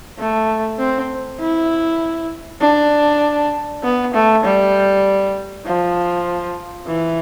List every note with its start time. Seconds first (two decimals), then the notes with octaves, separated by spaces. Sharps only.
0.19 A3
0.79 C4
1.40 E4
2.61 D4
3.83 B3
4.14 A3
4.44 G3
5.65 F3
6.87 E3